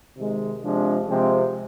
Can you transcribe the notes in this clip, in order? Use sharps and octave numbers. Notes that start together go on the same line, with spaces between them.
C3 D#3 G#3
C3 F3 G#3 D4
C3 F3 G#3 C4